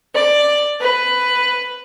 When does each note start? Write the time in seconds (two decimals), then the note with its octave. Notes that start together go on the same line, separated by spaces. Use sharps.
0.14 D5
0.80 B4